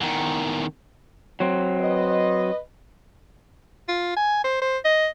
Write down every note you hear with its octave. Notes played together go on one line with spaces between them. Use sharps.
E2 D#3
F#3 C4
B4 D#5
F4
G#5
C5
C5
D#5